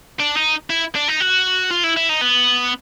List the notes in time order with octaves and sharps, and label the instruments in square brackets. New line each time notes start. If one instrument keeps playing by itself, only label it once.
[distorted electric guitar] D4
D#4
E4
D4
D#4
F#4
F4
E4
E4
D#4
B3